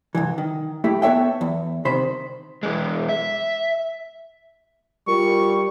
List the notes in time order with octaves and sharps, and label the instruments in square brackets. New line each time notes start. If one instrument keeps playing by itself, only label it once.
[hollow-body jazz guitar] C2 G2 E3
D#3
A2 A3 E4 G4
B3 A4 C#5 E5 G5
E2
C2 C3 D#3 C5 B5
[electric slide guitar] E2 G#3
E5
[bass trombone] G3 [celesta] F4 A#4 [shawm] C#6